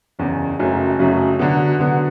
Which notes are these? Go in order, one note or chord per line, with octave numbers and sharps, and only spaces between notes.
F#1 E2 C#3
F#1 F#2 C#3 F#3 A3
F#1 F#2 C#3 F#3 A3
D3 F#3 B3
D3 F#3 B3